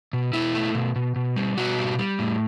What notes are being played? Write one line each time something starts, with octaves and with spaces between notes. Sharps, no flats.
B2
B2 E4
A3
B2
B2
B2
G3
B2 F#4
G3
G3
A2